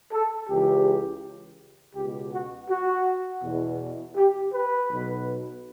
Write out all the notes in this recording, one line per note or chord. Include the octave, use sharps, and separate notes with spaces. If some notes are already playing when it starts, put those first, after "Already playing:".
A4
C#2 C#3 E3 G4
C#2 B2 G4
F#4
F#4
E2 B2
G4
B4
B1 B2